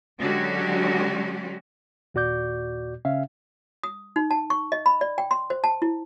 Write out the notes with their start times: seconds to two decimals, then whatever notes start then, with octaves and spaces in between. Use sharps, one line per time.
0.20 D3 F#3 G#3 C#4 F#4 G4
2.14 D#2 A#2 F#4 D5 D6 G6
3.05 C#3 C#4 E5 F5
3.83 D#6
4.16 D#4
4.31 A5
4.50 C#6
4.72 D#5
4.86 B5
5.01 D5
5.18 G5
5.31 C6
5.50 C5
5.64 A5
5.82 E4